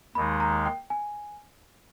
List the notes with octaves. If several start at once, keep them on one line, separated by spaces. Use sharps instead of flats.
D#2 D#3 G#3 D#4 B5
A#5
G5
G#5